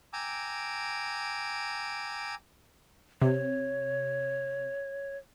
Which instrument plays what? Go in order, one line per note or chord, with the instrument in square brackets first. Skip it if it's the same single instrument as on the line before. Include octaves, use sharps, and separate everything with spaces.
[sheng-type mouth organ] G5 G#5 A#5 D6 E6
[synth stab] C3 [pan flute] C#5